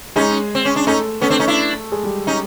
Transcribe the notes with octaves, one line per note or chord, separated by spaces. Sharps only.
G#3 C#4 D#4 G#4
C4
C#4
D4
A3 C#4 D#4 A4
A3 B3 C#4 A4
C4 D4
C#4 D#4
D4 E4
G#3 G#4
G3 G4
C#4 D#4